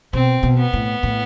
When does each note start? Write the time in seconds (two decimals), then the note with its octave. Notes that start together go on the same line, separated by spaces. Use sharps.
0.13 B2 C4
0.43 B2
0.58 B3
0.73 A2
1.03 A2